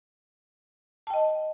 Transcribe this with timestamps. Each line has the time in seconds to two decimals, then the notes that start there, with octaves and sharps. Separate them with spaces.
1.07 A5
1.10 G5
1.14 D#5